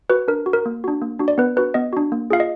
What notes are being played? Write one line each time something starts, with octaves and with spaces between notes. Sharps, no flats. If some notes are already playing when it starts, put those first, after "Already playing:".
F#4 B4
D4 A#4
F#4
A#4
A#3
D4 F#4
A#3
D4 F#4
D5
B3 B4
D4 F#4 B4
B3 D#5
D4 F#4
A#3
F4 G#4 F5
D#5